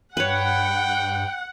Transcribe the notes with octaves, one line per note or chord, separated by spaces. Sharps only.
G2 B4 C#5 F#5 G5